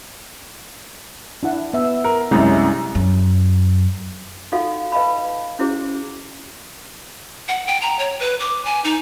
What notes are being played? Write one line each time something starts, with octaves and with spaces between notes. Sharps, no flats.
D4 E4 F#5
B3 E5
A#4
C2 F#2 G3 G#3 C#4 E4
F#2
D#4 F4 F#4 A4 F5 F#5
B4 D#5 F5 A5 B5
C#4 E4 F#4 G#4 C5
F#5
G5
A#5
C#5
B4
D6
G#5
D#4